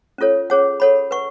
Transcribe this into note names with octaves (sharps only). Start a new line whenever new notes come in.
C#4 F4 A4 C#5
C#4 G#4 C#5 F#5
A4 C#5 F#5 B5
B4 F#5 C#6